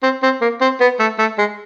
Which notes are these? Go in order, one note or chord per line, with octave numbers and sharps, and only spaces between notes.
C4
C4
A#3
C4
B3
A3
A3
G#3